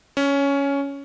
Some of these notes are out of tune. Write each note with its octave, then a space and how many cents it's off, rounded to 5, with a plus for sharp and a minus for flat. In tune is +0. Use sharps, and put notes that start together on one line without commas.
C#4 +10